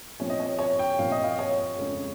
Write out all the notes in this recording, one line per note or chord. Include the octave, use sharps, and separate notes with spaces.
A#2 F3 C4 C#5
D#5
C#5
C#5
G5
A#2 F3 C4 F5
D#5
F5
C#5
F2 C#3 G#3 C#4